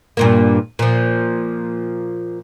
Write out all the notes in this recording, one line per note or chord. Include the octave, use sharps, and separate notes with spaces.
G2 A#2 A#3
A#2 F3